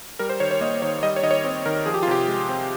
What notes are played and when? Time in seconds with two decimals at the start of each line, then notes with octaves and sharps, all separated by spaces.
0.19 G3 A#4
0.29 C5
0.40 D#3 C#5
0.51 C#5
0.61 A#3 D#5
0.82 D#3 C#5
1.03 G3 D#5
1.16 C#5
1.23 D#3 D#5
1.31 C#5
1.44 C4 C#5
1.66 D#3 A#4
1.86 F3 G#4
1.94 G4
2.03 F4
2.07 C3 G4
2.28 G#3
2.49 C4